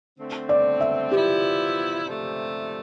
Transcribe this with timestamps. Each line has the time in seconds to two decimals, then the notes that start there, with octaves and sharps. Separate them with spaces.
0.18 D3 A3 C4
0.49 D5
0.81 E5
1.11 F3 B3 E4 G4
2.05 C3 F3 A3